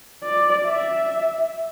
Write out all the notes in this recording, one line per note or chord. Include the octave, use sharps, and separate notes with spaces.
D5
E5